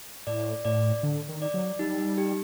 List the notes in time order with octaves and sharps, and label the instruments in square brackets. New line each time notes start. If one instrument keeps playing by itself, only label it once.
[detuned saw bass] A2 [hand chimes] D5
[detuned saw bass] A2 [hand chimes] D5
[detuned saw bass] D3
D#3
[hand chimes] D5
[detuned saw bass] F#3
[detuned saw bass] G3 [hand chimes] D#4
[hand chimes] D#4
G4